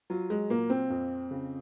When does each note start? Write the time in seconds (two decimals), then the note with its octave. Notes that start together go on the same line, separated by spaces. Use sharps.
0.10 F#3 F4
0.30 G#3
0.50 A#2 A#3
0.70 C4
0.90 F2
1.31 C#3